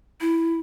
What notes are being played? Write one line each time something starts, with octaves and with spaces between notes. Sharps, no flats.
E4